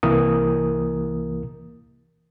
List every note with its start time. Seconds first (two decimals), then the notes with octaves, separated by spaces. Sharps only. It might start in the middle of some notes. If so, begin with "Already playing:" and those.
0.03 C2 E3 A#3 A#4 D#6